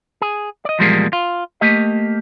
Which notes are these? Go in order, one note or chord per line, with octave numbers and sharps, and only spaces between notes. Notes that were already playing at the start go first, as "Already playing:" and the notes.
G#4
D5 D#5
E2 A#2 F3 G3 G#3 A#3
F4
A3 A#3 G4 D#5